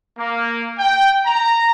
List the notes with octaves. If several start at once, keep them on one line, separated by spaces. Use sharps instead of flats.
A#3
G5
A#5